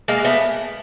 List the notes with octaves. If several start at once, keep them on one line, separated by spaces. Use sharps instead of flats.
G#3 A#3
A3 B3